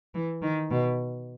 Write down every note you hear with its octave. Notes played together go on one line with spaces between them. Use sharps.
E3
D#3
B2